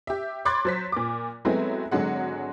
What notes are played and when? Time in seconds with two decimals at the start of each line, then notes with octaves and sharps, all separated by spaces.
0.07 G4 E5
0.45 B5 C6 D6 F#6 G#6 A6
0.65 F#3 C5 B6
0.92 A#2 D6
1.45 F#3 G#3 A3 B3 C4 E4
1.91 G#1 D3 F#3 G#3 F#5